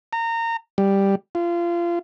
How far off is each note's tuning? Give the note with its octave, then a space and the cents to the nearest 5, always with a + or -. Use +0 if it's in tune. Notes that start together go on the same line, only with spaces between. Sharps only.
A#5 -25
G3 +5
F4 -25